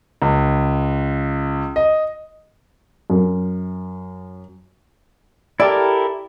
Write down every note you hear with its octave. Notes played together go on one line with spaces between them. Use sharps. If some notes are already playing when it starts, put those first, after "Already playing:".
C#2
D#5
F#2
E4 G4 A4 A#4 D5